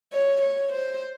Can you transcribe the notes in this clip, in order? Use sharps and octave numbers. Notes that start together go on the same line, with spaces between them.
C#5
C#5
C5